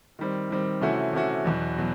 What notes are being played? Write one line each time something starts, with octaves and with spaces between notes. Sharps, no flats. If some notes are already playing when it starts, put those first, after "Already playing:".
D#3 G3 C4
D#3 G3 C4
C3 E3 A3 C#4 F#4
C3 E3 A3 C#4 F#4
E2 B2 F#3
B2 F#3